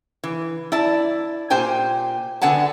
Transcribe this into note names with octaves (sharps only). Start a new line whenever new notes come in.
E3
E4 D5 A5
A#2 G4 C5 G5 G#5
D3 B3 F#5 G#5 A5